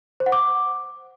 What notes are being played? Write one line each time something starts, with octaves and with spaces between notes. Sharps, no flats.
C5
F#5
D6